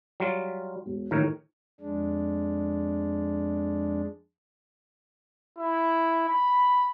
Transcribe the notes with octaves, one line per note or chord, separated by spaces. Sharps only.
F#3 G3 F4
E1
A2 D#3 E3 A#4 C#5
F2 G#3 D4
E4
B5